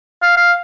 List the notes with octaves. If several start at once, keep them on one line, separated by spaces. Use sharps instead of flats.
F5
F5